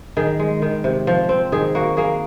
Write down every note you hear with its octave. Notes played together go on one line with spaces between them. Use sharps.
D#3 G#4
G#3
D#3
C3
F3
C4
D#3 G#4
A#3 F#4
A#3 G#4